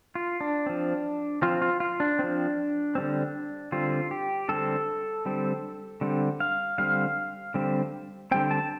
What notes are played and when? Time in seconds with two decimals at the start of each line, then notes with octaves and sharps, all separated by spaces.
0.15 F4
0.41 D4
0.66 F3 C4
1.42 F3 C4 F4
1.62 F4
1.80 F4
2.00 D4
2.19 F3 C4
2.95 D3 G3 C4
3.72 D3 G3 C4 F4
4.11 G4
4.49 D3 G3 C4 A4
5.25 D3 G3 C4
6.01 D3 G3 C4
6.40 F5
6.78 D3 G3 C4 F5
7.54 D3 G3 C4
8.31 D3 G3 C4 G5
8.51 A5